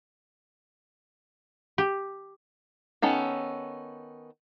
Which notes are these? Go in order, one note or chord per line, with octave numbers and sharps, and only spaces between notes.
G4
D#3 B3 C#4 A4